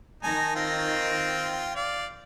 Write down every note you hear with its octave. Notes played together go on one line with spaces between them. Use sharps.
D#3 D#4 G#5 A5 A#6
C4 F4 G5
D5 F5